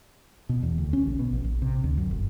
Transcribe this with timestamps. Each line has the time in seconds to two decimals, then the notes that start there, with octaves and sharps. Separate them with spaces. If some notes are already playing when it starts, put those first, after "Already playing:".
0.49 B2
0.63 E2
0.78 D2
0.93 C#4
1.07 A#1
1.19 B2
1.33 A#1
1.44 A#1
1.62 C3
1.84 D2
1.98 F#2
2.11 G1